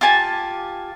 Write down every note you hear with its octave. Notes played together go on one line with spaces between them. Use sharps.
F4 G4 G#5 A5